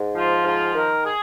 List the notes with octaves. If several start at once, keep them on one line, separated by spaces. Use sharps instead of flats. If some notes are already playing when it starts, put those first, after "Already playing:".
Already playing: G#2
F3 F4
G#2 F4
D#3 A#4
G#4